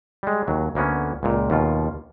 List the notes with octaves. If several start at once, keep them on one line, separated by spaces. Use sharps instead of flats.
G3 G#3
D#2 F#3
D2 A#3 B3 C#4
C#2 A#2
D#2 B2 F4